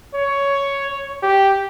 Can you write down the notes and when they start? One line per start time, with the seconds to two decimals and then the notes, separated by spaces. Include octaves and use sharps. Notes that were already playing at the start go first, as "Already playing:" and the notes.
0.15 C#5
1.23 G4